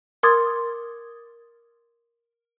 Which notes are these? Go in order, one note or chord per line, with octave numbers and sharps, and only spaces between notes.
A#4 C6 D6 D#6 G#6 A6